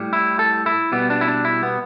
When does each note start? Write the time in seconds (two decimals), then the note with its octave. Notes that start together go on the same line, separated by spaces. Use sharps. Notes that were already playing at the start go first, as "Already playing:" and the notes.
Already playing: A2 G3
0.13 E4
0.39 A4
0.66 E4
0.92 B2 G3 B3
1.10 D4
1.21 E4
1.28 D4
1.45 E4
1.63 B3